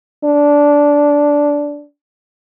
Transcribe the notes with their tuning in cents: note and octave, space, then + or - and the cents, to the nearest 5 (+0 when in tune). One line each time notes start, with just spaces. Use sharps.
D4 -10